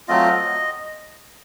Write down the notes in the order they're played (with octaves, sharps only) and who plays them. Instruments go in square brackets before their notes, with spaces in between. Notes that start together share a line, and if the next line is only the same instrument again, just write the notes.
[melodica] F#3 A3 C4 F4 D#5